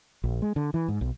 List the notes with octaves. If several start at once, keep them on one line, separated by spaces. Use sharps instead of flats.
A#1
G#3
D3
E3
G#2
B1